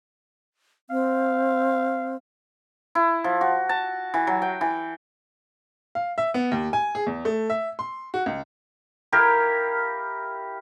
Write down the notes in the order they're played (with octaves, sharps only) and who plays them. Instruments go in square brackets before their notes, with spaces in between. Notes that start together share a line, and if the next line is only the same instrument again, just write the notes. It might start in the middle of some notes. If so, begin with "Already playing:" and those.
[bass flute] C4 [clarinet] F5
[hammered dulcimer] E4
F3
F#4
A5
E3
F#3
G5
E3
[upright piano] F5
E5
B3
D#2
G#5
G#4
E2
A3
E5
C6
F#4
C#2
[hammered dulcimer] E4 G4 A#4 F5